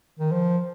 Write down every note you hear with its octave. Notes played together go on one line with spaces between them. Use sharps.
D#3
F3